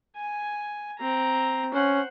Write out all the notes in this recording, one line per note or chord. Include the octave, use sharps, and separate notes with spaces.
G#5
C4 A#5
C#4 C5 F#5